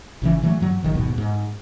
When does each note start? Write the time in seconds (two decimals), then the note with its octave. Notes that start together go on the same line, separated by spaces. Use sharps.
0.22 G#1 C#3 E3
0.43 D3 E3 F#3 A3
0.61 G2 F#3
0.83 G1 D#3 F#3
0.95 D#1 G#2 B2
1.18 G#2